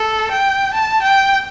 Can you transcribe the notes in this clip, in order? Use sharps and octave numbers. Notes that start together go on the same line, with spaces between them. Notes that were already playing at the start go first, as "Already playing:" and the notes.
Already playing: A4
G5
A5
G5